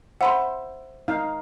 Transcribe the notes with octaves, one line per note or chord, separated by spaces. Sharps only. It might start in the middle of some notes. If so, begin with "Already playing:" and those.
C5 E5 F#5 B5 C6
D#4 F5